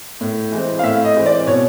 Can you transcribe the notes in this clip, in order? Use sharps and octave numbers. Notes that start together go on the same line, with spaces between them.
A2
E3 G#3 C4
F5
A2 E5
D#5
E3 G#3 C4
D5
B2 C#5